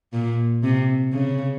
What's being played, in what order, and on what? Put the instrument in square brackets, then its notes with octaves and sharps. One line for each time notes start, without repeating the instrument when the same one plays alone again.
[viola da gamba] A#2
C3
C#3